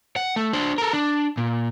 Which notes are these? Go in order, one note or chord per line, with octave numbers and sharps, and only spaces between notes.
F#5
A3
D4 C5
A4 A#4
D4
A#2